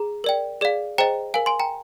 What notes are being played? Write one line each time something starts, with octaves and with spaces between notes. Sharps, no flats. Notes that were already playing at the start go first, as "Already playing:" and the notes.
Already playing: G#4 A#5
A#4 D5 G5
G#4 D5 F5
G#4 C5 D#5 G5 A#5
A#4 F5 G#5
G#5 C6
G5 A#5